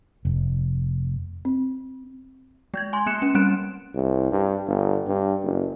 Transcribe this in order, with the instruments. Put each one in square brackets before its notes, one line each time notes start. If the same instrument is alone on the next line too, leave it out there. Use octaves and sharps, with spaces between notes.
[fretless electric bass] F1
[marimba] C4
[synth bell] G#3 G6 G#6
G#5 C6
A#3 F#6 C#7 E7
C#4
G3 C4 F#6 D7 E7
[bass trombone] C2
G2
G1
G2
F#1